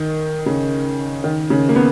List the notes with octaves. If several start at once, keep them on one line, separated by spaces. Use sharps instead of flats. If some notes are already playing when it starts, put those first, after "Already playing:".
Already playing: D#3
C#3
D#3
C#3
A#3
B3